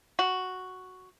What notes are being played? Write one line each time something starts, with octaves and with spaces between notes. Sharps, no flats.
F#4